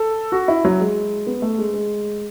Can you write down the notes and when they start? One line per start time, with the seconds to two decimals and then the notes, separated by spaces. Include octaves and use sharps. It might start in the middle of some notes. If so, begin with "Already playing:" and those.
Already playing: A4
0.32 F#4
0.48 E4
0.65 F#3
0.80 G#3
1.27 B3
1.42 A3
1.58 G#3
1.74 G#3